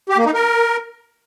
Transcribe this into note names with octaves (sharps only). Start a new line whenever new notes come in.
G4
A#3
D#4
A#4